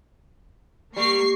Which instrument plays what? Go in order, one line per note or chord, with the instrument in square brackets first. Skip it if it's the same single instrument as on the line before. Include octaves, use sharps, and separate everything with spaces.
[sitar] G3 [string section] A#3 C#6 C7